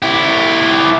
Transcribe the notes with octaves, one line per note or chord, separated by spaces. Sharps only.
E4 G4